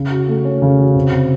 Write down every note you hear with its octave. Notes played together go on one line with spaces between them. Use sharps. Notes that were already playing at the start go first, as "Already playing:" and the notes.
Already playing: C#3
F#4
A3
C#4
C#3
F#4
C3
C3